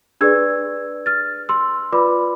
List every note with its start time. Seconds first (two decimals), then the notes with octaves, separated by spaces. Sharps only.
0.21 D4 G#4 B4 D5 E6 G#6
1.06 F6 A6
1.49 C6 E6
1.92 F4 B4 D5 B5 D6